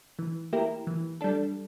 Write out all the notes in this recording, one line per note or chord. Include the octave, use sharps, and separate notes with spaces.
E3
A#3 E4 G4 A#4
E3
G3 D4 A4